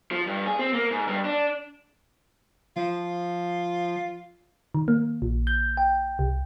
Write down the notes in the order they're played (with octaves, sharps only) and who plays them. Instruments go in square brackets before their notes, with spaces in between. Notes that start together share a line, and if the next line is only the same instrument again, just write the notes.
[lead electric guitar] F3
G2
G#4
C4
A#3
G#2
G2
D4
[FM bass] F3 [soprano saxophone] F4
[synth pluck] D#3
A#3
A#1
G6
G5
C2